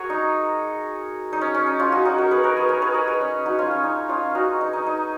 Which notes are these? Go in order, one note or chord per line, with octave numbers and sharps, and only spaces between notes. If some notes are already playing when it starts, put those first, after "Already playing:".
Already playing: F#4 G#4 A#4 C#5
D#4
D#4
C#4
C#4
D#4
C#4 F4
D#4 F#4
D#4 F#4
F#4 A#4
G#4 B4
A#4 C#5
G#4 B4
A#4 C#5
G#4 B4
A#4 C#5
G#4 B4
C#4
D#4 F#4
C#4 F4
C#4
D#4
C#4 F4
D#4 F#4
D#4
D#4
D#4